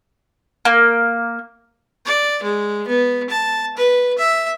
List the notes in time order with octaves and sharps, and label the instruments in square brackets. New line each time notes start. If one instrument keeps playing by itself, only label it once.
[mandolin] A#3
[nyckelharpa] D5
G#3
B3
A5
B4
E5